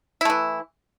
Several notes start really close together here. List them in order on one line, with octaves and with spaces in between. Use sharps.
E4 A3 E3